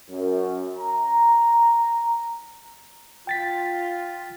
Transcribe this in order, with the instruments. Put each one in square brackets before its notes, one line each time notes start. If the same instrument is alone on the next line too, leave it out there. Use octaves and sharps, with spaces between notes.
[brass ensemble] F#2
A#5
[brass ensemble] F4 [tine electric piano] G5 A6 B6